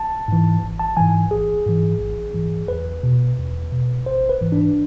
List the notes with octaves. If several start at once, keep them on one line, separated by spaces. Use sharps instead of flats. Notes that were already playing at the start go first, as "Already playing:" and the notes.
Already playing: A5
G#2 E3
G#1
A5
G#2 E3 G#5
A1 G#4
G#2 E3
A1
G#2 E3
E2 B4
B2
E2
B2
G#1 C5
B4
G#2 E3
D4